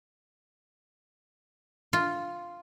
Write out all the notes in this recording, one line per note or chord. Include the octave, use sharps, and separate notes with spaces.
F4